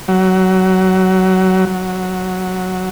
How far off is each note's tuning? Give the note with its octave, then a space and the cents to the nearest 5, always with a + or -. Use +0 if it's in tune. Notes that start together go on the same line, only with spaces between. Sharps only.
F#3 +20
F#3 +0